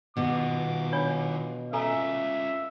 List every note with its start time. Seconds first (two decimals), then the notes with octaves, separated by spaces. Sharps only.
0.17 B2 D#3 F4 D6
0.92 D4 C#5 B5
1.73 C#4 F4 A4 E5 G#5 A#5